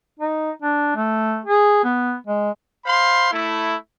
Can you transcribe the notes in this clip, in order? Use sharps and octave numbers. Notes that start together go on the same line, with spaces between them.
D#4
D4
A3
G#4
B3
G#3
C5 F5 B5 C6
A3 E4